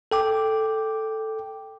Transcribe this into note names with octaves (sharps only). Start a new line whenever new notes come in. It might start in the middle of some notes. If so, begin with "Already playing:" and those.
A4 G5 D6